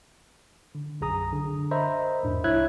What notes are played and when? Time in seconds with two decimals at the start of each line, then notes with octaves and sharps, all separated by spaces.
0.75 D3
1.01 B1 F#2 G#4 A#5 D#6
1.33 D3
1.71 A#4 C5 D#5 E5 A#5 B5
2.23 E2 G#2 B2 D4
2.44 C2 E4 C#5 E5 F#6 G#6